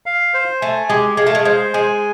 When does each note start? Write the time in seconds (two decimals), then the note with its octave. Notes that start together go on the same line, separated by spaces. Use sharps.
0.06 F5
0.34 C5
0.61 A3 G#5
0.90 G#3 G4
1.17 G#3 F5
1.27 A3
1.35 G#3
1.45 G#3 C5
1.74 G#3 G#5